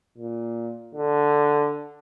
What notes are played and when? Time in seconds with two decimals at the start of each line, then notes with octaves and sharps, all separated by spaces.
0.18 A#2
0.95 D3